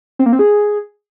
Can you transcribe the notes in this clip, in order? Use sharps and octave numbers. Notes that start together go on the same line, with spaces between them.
C4
A#3
C4
G#4